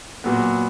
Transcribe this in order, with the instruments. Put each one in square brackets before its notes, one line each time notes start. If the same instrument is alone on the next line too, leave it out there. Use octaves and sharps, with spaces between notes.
[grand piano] A#2 F#3 B3